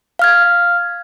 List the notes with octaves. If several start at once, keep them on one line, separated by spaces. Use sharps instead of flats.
F5 F6 G#6